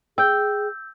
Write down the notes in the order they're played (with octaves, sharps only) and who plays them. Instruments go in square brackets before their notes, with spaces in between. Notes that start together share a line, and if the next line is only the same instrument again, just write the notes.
[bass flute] G#4 [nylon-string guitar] G5 [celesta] E6 G6